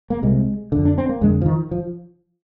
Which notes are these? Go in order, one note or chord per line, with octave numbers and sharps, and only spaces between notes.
A#3
C2 C3 G#3
F2 D3
D4
C4
A#3
F2 D3 G#3
F3
D#3
F3